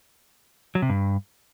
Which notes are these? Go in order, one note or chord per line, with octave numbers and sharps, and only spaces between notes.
F#3
C3
G2